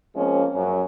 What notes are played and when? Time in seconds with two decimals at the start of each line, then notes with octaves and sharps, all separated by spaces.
0.15 F3 G#3 A#3 C4 C#4
0.56 F#2 F#3